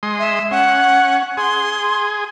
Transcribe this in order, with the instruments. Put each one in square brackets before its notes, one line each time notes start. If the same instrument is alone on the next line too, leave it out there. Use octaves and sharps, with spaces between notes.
[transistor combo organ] G#3 C6 D#6
[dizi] E5
[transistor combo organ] C#4 [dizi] F#5
[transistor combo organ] G#4 [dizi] C6